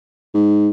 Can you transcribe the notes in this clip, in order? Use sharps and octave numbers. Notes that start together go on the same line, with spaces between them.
G#2